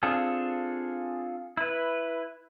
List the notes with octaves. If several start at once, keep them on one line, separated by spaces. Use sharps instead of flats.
C4 D4 F4 G#4 A4
E4 B4